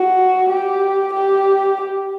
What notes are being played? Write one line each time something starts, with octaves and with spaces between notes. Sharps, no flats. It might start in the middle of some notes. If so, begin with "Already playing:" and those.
Already playing: F#4
G4
G4